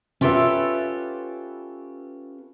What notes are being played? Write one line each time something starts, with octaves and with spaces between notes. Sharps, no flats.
C#4 F4 G4 A4 B4 E5